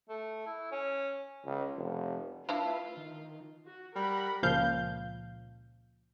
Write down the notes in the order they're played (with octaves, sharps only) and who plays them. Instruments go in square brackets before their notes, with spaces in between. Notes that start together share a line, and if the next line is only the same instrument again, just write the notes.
[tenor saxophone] A3
E4
C#4
[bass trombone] C#2
F1
[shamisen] D4 E4 F5 [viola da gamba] F4 [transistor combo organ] B4 E5 [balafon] A5
[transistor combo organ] D#3
[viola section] F#4
[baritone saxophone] G3 [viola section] A#4 F#5 B5
[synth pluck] C#2 A#2 F3 F5 G6